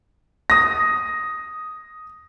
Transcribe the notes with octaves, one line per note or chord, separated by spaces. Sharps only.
D#6 A#6